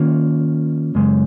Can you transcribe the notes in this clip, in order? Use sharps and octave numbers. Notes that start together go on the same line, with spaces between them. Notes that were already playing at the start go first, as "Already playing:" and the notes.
Already playing: D#3 A#3 C#4 F4
F#2 C#3 G#3